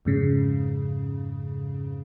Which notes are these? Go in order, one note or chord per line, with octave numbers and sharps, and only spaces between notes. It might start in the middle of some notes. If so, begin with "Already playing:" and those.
F2 G#2 C#3